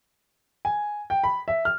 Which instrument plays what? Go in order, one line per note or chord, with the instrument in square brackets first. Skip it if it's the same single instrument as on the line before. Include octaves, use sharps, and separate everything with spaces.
[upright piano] G#5
G5
B5
E5
F6